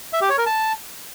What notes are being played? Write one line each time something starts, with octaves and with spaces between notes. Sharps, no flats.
E5
G4
C#5
A#4
A5